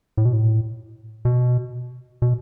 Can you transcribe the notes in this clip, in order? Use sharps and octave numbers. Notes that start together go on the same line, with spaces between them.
A2
B2
A2
B2
B2